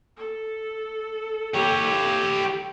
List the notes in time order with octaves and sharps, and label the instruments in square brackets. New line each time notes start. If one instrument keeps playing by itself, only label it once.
[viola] A4
[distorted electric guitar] G4 C#5